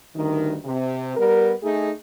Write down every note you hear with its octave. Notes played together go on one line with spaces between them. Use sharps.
D2 G2 D#3
C3
G3 B3 A#4
A3 D#4 G#4